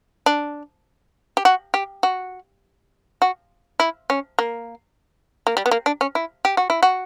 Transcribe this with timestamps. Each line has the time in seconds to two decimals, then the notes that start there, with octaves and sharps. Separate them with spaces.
0.26 D4
1.37 G4
1.45 F#4
1.74 G4
2.03 F#4
3.22 F#4
3.80 E4
4.10 C#4
4.39 A#3
5.47 A#3
5.57 G3
5.66 B3
5.71 A#3
5.86 D4
6.01 C#4
6.15 E4
6.45 G4
6.57 F#4
6.70 E4
6.83 F#4